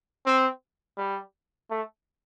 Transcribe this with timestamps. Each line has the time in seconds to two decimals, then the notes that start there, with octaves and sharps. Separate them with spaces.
0.26 C4
0.98 G3
1.71 A3